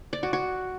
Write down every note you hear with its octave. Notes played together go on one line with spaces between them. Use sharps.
D5
F#4
F#4